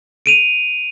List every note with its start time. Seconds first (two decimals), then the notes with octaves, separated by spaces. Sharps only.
0.26 D7 D#7 F7